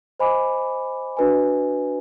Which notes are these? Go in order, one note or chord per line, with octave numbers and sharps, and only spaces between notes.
C5 D#5 G#5 B5 D6
D4 F#4 B4 D#5 G#5